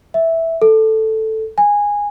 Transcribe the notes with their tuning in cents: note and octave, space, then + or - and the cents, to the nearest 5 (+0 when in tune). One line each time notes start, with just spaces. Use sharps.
E5 -5
A4 +0
G#5 -15